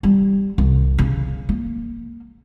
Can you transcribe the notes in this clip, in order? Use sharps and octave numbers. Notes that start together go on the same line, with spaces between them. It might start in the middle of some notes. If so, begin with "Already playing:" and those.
G3
C2
C#3
A#3